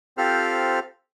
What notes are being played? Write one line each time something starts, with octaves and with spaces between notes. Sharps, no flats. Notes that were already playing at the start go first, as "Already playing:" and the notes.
C4 F4 G4 A4 C5 F6